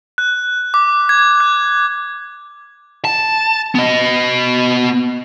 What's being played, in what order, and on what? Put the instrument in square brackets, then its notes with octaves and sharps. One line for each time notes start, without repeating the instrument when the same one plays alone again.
[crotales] F#6
D6
G#6
F#6
[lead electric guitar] A5
B3 D#5